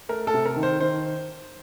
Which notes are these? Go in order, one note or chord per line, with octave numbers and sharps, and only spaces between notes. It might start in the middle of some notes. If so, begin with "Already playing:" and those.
A3 A#4
A4
C3
A#4
D#3
C5
D#3 C5